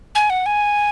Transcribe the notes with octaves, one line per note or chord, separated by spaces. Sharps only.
G#5
F#5
G#5